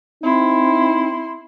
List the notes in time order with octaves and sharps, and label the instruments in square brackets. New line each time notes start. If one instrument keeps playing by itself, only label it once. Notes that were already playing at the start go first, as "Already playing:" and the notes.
[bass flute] C4 [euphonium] D#4 [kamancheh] E4 C6